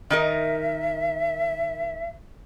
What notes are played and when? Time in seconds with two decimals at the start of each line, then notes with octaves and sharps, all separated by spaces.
0.10 D#3 D#4 A#4 E5